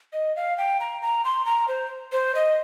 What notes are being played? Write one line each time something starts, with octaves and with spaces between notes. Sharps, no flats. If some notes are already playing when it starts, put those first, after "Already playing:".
D#5
F5
G5
A#5
A#5
C6
A#5
C5
C5
D#5